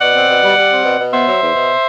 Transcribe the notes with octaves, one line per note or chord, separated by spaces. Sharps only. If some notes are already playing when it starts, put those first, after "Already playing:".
B2 D5 F#5
C4
B2
G3
G3
C4
B2
B2
B3 C5 E5
F#3
E2
B2